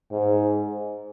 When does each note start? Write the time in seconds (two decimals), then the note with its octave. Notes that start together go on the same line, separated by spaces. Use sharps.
0.12 G#2